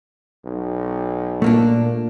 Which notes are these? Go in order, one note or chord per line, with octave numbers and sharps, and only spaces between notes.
B1
A#2 A3 A#3 D4